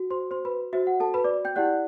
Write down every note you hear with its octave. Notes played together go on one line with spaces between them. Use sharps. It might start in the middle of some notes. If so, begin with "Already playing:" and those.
Already playing: F#4
C5 C6
C5 C6
B4 B5
F#4 C5 E5
F#5
A4 A5
B4 B5
D5 D6
G5 G6
E4 G4 D5 F#5 F#6